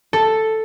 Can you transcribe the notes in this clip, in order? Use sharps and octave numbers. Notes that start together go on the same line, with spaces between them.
A4